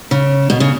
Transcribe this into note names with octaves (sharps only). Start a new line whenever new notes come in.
C#3
B2
C#3